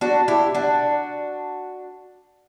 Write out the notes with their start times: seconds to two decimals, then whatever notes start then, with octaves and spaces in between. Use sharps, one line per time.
0.01 D4 F#4
0.28 E4 G4
0.54 D4 F#4